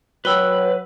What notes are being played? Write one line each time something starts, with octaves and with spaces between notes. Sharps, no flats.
F#3 F#4 B4 G5 B5 E6 G7